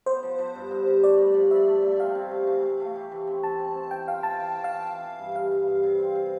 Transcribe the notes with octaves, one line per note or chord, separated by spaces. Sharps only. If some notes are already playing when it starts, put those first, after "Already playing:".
B3 C5
F3
F3
G2
G2
G2
A3 D5
G2
F3
G2 E5
A3
A3
C4 F5
C3
A3
E3
A3
A3
G4
E3
C4
E3 A5
C4
C4
E3 G5
F4 F5
F4 A5
E3
E3
F5
E3
E3
E3
G2
G2 F5
G2
G2
C3
C4
C3